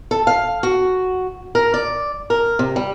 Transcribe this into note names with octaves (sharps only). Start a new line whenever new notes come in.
A4
F5
F#4
A#4
D5
A#4
C3
G3